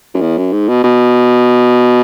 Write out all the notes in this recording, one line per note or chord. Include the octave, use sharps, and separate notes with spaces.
F#2
E2
F#2
G#2
B2
B2